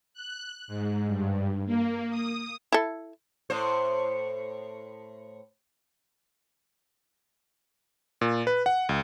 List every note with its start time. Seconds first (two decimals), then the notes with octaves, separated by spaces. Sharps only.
0.14 F#6
0.68 G#2
1.07 G2
1.66 A#3
2.10 D#6
2.72 E4 A4
3.50 A2 C5
8.21 A#2
8.47 B4
8.66 F#5
8.89 C#2